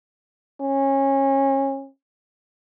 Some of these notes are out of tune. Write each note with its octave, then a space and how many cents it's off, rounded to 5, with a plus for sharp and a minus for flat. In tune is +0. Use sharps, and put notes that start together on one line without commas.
C#4 -25